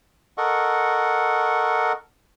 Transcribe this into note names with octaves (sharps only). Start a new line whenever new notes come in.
A4 A#4 D#5 F#5 C#6